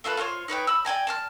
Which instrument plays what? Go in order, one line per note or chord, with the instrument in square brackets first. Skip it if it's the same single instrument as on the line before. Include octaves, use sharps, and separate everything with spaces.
[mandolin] A3 F4 A4 B4
F4 A4 C5 C#5
D#4 B4 C#5 G5
B5 E6
D5 G5 G#5 A#5
A5 C6 F6